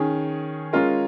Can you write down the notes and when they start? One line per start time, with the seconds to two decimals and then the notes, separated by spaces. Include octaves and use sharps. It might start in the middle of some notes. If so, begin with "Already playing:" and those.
Already playing: D#3 C#4 G#4
0.73 G#3 C#4 F4 A#4